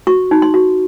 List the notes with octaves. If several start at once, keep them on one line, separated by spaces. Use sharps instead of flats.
F#4 C#6
D#4
C6
F#4